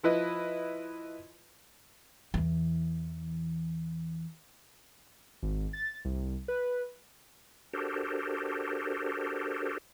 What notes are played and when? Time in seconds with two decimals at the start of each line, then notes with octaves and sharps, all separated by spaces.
0.03 F3 E4 B4 D#5
2.34 E2 E3
5.43 G#1
5.73 A6
6.05 C2
6.48 B4
7.73 D4 F#4 G4 A4 A#4 C5